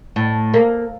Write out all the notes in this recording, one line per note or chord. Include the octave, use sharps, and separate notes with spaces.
A2
A#3